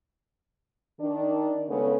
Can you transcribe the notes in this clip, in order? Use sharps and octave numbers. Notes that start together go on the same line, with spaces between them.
D#3 D4
C#3 G#3 A3 B3 C#4